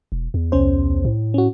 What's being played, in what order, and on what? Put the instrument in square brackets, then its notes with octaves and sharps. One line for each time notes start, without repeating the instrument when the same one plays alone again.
[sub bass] E1
E2
[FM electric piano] C2 C#4 C5
[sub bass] A2
[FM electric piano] C#4 F#4